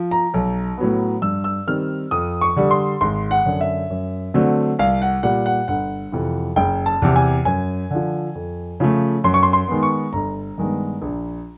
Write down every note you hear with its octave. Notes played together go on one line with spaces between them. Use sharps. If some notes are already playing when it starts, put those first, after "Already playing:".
Already playing: F3
A#5
B1
A2 F#3 B3
G2 E6
E6
D#3 G3 C4 F6
F2 D#6
C#6
D3 G3
C6
G#1 C6
F#5
F#2 D3
E5
F#2
D3 F#3 A3 C4
C2 F5
F#5
A#2 G3 F#5
F#5
G1 F#5
F2 C3 E3
F#1 G5
A5
E2 C3
G#5
F#2 G#5
D3 F3
F2
C#3 F3 A3
F#2 C6
C#6
C6
C6
D#3 G#3 B3
C#6
G1 A#5
G2 D#3 G#3 B3
A#1